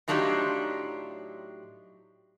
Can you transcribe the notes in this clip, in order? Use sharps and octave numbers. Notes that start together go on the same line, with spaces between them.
A2 F#3 D4 D#4 F4 G4